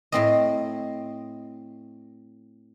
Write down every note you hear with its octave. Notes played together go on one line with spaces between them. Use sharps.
A2 C4 D#5